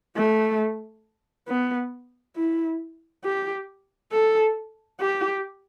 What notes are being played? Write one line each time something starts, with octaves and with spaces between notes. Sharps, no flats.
A3
B3
E4
G4
A4
G4